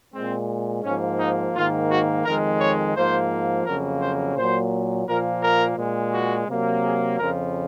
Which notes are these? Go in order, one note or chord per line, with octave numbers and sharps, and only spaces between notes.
A#2 G#3 C4
G#2 F3 A#3 C#4
D#4
G#2 D#3 A#3 F4
F#4
F2 D#3 G#3 A#4
C#5
G#2 F3 A#3 C5
F2 C#3 F#3 A#3 A#4
C5
A#2 F#3 A#3 C5
A#2 F3 A#3 A#4
A#4
A#2 G#3
F#4
C3 F#3 A#3
G#4
F2 C#3 F3 A#4